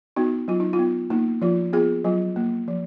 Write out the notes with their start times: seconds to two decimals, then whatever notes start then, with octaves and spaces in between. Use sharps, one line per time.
0.16 B3 D#4 F#4
0.48 F#3 F4
0.60 D#4
0.73 F4
0.79 B3
1.10 A#3 D#4
1.42 F3 F4
1.73 B3 F4 G#4
2.04 F#3 F4
2.36 A#3
2.68 F3